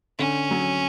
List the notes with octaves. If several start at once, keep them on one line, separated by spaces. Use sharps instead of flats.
D3 C#4
F#3